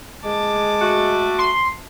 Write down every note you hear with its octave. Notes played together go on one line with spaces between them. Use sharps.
G#3 A5 D6
A3 F#4
C6